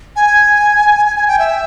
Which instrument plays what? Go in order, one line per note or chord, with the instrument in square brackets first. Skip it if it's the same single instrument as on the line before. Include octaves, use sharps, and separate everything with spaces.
[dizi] G#5
G#5
G#5
G5
E5